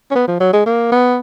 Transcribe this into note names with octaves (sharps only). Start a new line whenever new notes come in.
C#4
B3
F3
F#3
G#3
A#3
B3